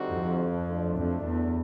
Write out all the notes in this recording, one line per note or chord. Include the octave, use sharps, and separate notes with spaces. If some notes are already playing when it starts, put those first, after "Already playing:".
Already playing: D3 G3 C4 D#4 F#4
F2
F#3 A3 D4
F2
E2